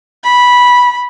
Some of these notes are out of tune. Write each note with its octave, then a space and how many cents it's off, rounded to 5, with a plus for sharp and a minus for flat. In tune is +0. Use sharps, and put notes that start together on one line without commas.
B5 -10